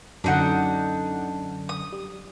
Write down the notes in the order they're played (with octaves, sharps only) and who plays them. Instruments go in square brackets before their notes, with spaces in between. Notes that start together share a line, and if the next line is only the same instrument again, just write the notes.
[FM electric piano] F#2 D3 [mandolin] D4 D#4 F#5
[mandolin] D#6
[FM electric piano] G3